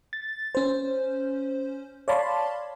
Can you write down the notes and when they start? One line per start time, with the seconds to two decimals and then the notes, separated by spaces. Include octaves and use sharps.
0.13 A6
0.55 C#4 C5
2.08 C#5 D5 F5 A5 B5 C6